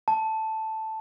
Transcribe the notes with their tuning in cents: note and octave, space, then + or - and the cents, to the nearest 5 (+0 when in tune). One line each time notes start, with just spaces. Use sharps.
A5 +0